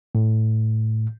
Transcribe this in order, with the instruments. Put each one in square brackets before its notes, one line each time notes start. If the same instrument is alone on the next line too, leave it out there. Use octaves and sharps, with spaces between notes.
[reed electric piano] A2